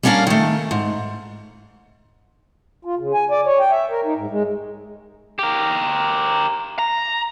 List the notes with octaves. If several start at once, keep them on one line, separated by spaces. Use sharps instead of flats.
G3 A#3 C#4 D4 A#4 F5
D#3 A3
G#2
F4
C#3
G#5
D5
C#5
G5
E5
A#4
D#4
G#2
G#3
G4 A#4
A#5